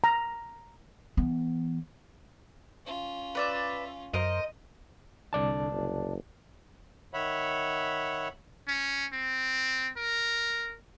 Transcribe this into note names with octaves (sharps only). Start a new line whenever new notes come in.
A#5
E3 B3
C#4 F4
B4 D5 E5
F#2 A#4 C5 D#5
C2 D3 D5 A5
F#1
D#3 C#5 E5 F#5 B5
C#4
C4
A#4